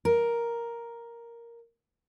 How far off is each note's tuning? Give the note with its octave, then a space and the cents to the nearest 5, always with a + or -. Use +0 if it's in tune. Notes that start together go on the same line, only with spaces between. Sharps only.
A#4 +5